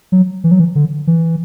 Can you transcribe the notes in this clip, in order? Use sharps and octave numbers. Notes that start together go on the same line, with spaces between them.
F#3
E3
F#3
E3
D3
E3